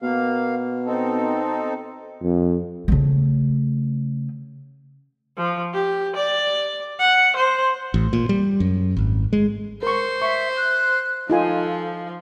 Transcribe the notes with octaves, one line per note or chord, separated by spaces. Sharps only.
B2 A#3 F5
C4 D#4 A4
F2
C#3 A3
F3
G4
D5
F#5
C5
A1
A#2
G3
F#2
G#1
G#3
A#4 C5 C#6
E5 C#6
F#6
F3 D#4 F4 A4 G#5